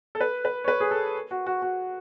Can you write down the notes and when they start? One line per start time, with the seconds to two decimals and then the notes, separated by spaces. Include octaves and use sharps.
0.15 A4
0.21 B4
0.45 B4
0.64 C#5
0.68 B4
0.80 G#4
0.91 A4
1.31 F#4
1.47 F#4
1.62 F#4